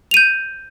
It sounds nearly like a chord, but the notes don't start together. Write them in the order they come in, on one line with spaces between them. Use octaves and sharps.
F7 D#7 G6